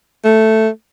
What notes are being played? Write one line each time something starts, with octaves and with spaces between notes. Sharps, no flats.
A3